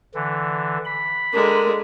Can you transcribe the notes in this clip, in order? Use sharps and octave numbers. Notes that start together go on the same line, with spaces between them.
D3 E3
B5
D3 G#3 A#4